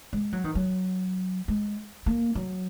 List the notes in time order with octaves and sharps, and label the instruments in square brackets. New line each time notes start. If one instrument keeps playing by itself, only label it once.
[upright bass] G#3
F#3
D#3
F#3
G#3
A#3
F#3